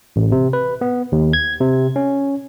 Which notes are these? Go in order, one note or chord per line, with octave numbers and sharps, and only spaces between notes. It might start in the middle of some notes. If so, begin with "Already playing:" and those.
A1
C3
B4
B3
D#2
G#6
C3
C#4